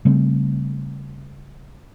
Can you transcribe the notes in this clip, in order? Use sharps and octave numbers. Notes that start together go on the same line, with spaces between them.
C#3 G3 A3 C4